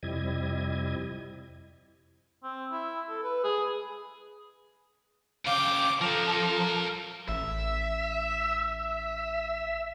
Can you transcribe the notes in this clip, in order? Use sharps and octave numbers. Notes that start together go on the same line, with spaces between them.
F2 C3 G3 E4 D#5 G#6
C4
E4
A4
B4
G#4
C#3 F5 G5 D6
F3 A4 A#4 F#5
A1 E5